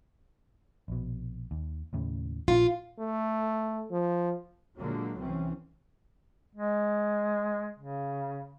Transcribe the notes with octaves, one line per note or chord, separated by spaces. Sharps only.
A#1 B2
D#2
D#2 A2 C#3
A#1 A#2 A#3 F4
A3
F3
A#2 D3 F#3 G#3 A#3
C2 E3 C4 C#4
G#3
C#3